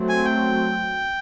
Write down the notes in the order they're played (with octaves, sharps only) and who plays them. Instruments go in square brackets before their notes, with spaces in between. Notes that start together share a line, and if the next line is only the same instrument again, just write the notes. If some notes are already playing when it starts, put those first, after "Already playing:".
Already playing: [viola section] F#3 A3 C4
[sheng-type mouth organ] G#5
G5